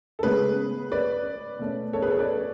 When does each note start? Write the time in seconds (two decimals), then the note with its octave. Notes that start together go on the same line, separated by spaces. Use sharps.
0.19 A4
0.23 C#3 G#3 B3 G#4 B4
0.92 B4 D5
1.59 B2 A3 C#4
1.93 A4 C#5
2.02 G#4 B4
2.10 A4 C#5
2.19 B4 D5